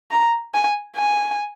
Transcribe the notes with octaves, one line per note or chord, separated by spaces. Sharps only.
A#5
G#5
G#5